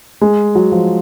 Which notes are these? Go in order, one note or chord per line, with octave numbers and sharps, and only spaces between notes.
G#3
F#3
F3